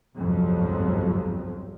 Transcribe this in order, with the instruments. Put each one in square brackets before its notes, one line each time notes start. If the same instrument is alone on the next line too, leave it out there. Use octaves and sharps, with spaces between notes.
[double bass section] G1 C2 F2 G#2 F3 F#3